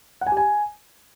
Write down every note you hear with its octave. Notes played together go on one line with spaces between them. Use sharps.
F#5
G#5
G4
G#5